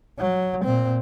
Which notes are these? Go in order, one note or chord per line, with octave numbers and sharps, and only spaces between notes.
F#3
A#2 C4